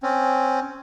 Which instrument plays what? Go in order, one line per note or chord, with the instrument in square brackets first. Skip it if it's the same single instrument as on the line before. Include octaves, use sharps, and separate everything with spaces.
[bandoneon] C4 C#4